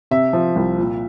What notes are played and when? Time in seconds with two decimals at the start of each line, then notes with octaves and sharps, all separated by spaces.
0.11 C3 E5
0.33 F3
0.56 C2
0.78 A#2